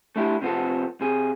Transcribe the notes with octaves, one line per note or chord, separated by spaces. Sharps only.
A3 D4 E4 G4
C3 F3 B3 C4 A4
C3 G#4